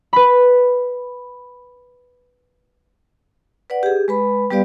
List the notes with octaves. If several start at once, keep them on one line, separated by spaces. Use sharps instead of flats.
B4 B5
B4 D5 F#5
G4 G#4
G#3 B4 B5
G3 B3 G4 B4 D5 F5